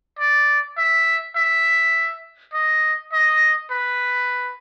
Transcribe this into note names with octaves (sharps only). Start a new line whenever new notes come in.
D5
E5
E5
D#5
D#5
B4